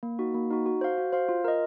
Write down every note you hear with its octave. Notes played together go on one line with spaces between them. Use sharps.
A#3
D#4 F#4
A#3
D#4 F#4
F#4
C5 F5
F#4
C5 F5
F4
A#4 D#5